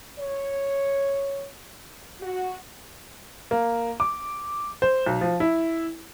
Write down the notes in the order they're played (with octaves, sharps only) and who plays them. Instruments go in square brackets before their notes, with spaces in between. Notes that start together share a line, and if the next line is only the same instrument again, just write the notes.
[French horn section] C#5
F#4
[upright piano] A#3
D6
C5
B1
F3
E4